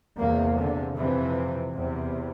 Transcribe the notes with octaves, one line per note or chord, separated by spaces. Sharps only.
E2 C3 A#3
D3
F2 C3 E3
E2 C3